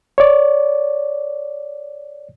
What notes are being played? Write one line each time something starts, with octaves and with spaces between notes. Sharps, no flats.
C#5 D5